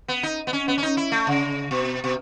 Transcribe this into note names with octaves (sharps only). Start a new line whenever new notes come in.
B3
D#4
B3
C#4
B3
C#4
D#4
E4
A3
C#3
B2
B2